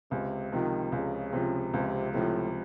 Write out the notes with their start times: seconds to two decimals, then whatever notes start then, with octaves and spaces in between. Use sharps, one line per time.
0.11 C#2 C3
0.52 C3 D#3 F3
0.92 C#2 C#3
1.33 C3 F3
1.73 C#2 C3
2.13 A2 C3 F3